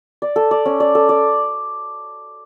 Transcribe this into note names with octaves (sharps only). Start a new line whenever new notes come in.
D5
A4
D5
C#4
D5
A4
D5